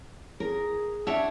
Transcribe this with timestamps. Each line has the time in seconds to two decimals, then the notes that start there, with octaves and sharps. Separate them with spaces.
0.40 G#4 A#4
1.07 D4 C#5 E5 F#5